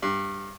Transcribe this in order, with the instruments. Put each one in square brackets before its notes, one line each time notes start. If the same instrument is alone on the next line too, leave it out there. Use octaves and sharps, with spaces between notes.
[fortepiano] G2